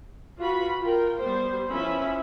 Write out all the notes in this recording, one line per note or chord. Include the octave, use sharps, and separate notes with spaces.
F4 F#4 B4 B5
F4 A#4 G5
G3 B3 C5
F3 C#4 E4 B4 E5 B5